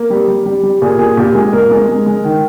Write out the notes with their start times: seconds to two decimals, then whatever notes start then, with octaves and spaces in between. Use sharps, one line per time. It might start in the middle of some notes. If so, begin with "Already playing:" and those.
Already playing: A#3
0.10 G3
0.28 G3
0.46 G3
0.63 G3
0.82 A#2 G#4
0.99 A#2 G#4
1.17 A#2 G4
1.35 G#3 G#4
1.53 A#2 A#4
1.71 G#3
1.89 G#3
2.06 G#3
2.24 D#3